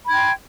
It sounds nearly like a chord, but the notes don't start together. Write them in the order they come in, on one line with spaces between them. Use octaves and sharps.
B5 G#6 G5 C6